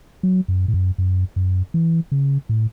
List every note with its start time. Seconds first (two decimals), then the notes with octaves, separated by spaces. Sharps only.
0.23 F#3
0.48 F#2
0.68 A2
0.74 F#2
0.98 F#2
1.36 F#2
1.74 E3
2.12 C#3
2.49 A2